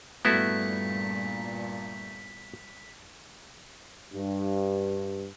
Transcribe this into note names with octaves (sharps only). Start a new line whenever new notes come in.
G2 A#2 A3 B3 E4 F#4 B6
G2